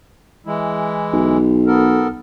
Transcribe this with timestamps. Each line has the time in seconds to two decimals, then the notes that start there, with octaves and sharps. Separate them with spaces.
0.46 E3 G#3 E4
1.13 B1
1.67 B3 A4 A#4